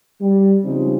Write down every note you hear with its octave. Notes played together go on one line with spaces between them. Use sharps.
G3
C#3 F3 G3 G#3 C4 D#4